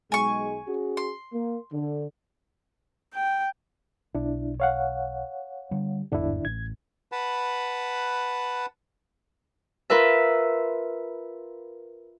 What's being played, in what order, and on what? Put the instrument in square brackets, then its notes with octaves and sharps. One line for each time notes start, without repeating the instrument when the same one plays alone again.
[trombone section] B1 G#3 [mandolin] G#5 C#6
[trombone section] C#4 F#4 G#4
[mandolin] C6
[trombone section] A#3
D3
[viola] G5
[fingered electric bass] B1 [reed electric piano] D4 E4
[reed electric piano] C#5 F5 F#5
[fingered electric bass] D3 G3
[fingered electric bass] G1 E2 G#2 [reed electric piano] D3 D4 E4
[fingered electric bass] A1 [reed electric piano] G#6
[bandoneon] B4 F#5 A5 B5
[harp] F4 A#4 B4 E5